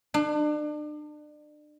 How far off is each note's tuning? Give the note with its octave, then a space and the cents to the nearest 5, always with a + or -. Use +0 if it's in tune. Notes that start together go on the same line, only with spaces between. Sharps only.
D4 +35